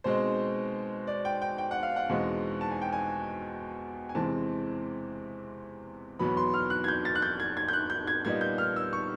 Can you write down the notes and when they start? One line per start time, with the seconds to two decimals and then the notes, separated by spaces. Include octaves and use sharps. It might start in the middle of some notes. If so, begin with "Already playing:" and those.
0.04 B2 G#3 C4 D#4 C5
1.07 D5
1.25 G5
1.42 G5
1.58 G5
1.71 F#5
1.83 F5
1.96 F#5
2.10 E2 B2 G#3 C4 D#4
2.61 A5
2.71 G#5
2.82 G5
2.93 G#5
4.09 G#5
4.15 E2 C3 E3 G#3 C4 A5
6.19 E2 B2 F#3 B3 B5
6.37 C6
6.54 F6
6.70 F#6
6.84 G#6
6.88 G6
7.05 A6
7.15 F#6
7.22 G6
7.40 G#6
7.57 G#6
7.68 G6
7.73 F#6
7.90 G6
8.07 G#6
8.25 A#2 G3 B3 D#4 G#6
8.41 G6
8.58 F6
8.76 E6
8.93 C#6